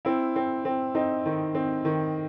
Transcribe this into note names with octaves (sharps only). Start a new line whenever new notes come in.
C4 E4
C4
C4
C4 D#4
D#3
C4
D#3